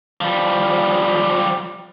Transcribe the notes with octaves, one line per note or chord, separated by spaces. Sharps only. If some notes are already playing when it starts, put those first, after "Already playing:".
F3 G3